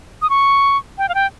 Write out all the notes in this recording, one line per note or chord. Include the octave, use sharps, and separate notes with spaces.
D#6
C#6
G5
F5
G5